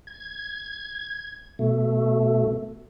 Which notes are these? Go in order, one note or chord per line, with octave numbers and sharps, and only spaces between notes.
G#6
B2 A3